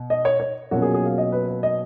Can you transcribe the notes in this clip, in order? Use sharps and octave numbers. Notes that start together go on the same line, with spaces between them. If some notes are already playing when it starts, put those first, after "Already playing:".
Already playing: B2
D#5
C#5
C#5
B2 F#3 A#3 C#4 F4 F#4
G#4
G#4
F5
D#5
B4
B4
D#5